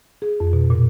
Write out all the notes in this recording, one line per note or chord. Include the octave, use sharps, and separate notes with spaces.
G#4
F2
B2
A#2